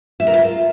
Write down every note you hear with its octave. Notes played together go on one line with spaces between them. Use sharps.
E5
A#4
F4